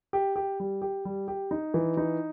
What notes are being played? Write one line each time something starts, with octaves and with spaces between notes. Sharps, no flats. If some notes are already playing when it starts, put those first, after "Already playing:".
G4
G4
G3
G4
G3
G4
D#4
E3
D#4